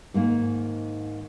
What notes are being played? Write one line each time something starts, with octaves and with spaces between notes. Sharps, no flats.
G#2 D#3 A#3